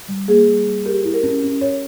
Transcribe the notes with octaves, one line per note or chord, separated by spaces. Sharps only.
G3
A#3 G#4
G3
G3
G4 A#4
E4
A#4
C#4
C#4
C#5